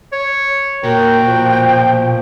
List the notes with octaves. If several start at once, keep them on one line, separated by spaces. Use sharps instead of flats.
C#5
A#2 F#4 A#4 G5
F3